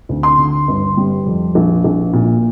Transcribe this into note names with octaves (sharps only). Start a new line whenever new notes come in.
D2
C6
D3
G1
G3
F2
A#1
A#1
A#2